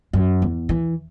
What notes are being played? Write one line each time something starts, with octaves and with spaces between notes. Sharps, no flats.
F#2
E2
E3